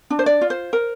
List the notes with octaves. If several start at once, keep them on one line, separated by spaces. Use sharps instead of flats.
D4
C5
D5
F4
C5
A#4